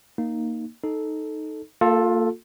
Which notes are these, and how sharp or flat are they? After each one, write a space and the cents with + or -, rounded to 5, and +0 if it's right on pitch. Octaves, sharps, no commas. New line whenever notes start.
A#3 +0 D#4 +0
D#4 +0 A4 -10
A#3 -30 F4 +20 A4 +0